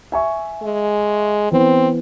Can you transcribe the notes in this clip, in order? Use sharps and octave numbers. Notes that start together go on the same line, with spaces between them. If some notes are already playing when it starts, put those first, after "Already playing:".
E5 G#5 C#6
G#3
E3 B3 C4 C5